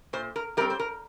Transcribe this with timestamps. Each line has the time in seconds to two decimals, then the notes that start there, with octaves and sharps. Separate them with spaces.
0.13 A#2 C5
0.36 A#4
0.57 G3 A#4
0.61 C4
0.70 C5
0.80 A#4